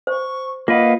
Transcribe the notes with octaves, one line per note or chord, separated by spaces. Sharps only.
C5 C#6
A#3 F4 B4 D#5 F5 F#5